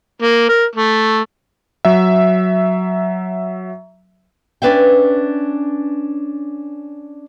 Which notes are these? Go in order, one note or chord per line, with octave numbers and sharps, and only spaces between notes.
A#3
A#4
A3
F#3 E5
C#4 D4 B4 E5 G5